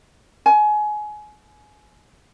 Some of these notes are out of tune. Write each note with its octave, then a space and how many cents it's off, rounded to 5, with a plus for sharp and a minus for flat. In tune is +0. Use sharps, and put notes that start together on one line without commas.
G#5 +25